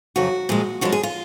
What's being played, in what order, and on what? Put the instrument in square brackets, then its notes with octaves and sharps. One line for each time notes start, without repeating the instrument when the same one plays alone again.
[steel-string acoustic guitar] F2 C#3 F#3 F#4
A#2 F3 G#3
F#2 F3 G#3 F#4
G#4
F4